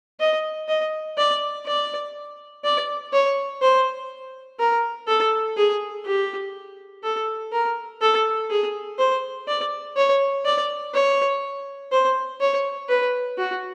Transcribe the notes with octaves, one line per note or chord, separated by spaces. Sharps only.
D#5
D#5
D5
D5
D5
C#5
C5
A#4
A4
G#4
G4
A4
A#4
A4
G#4
C5
D5
C#5
D5
C#5
C5
C#5
B4
F#4